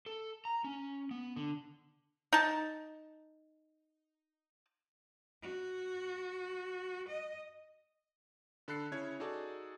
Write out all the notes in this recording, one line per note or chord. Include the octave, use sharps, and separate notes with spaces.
A4
A#5
C#4
B3
D3
D#4 A5
F#4
D#5
D3 A4 B5 F#6 C7 C#7
C#3 C#4 E4 C#5 G#6
D#4 F#4 G#4 A4 D5 A5